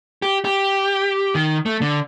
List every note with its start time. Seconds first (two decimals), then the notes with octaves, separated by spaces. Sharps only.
0.22 G4
0.45 G4
1.35 D#3
1.66 A3
1.81 D3